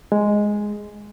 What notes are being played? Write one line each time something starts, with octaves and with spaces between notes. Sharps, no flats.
G#3